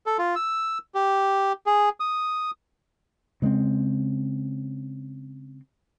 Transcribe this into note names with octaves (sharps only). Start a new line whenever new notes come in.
A4
F4
E6
G4
G#4
D#6
C#3 G#3 A3 C4